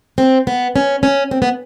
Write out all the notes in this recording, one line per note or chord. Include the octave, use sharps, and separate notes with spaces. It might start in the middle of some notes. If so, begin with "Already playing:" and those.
C4
B3
C#4
C#4
C4
B3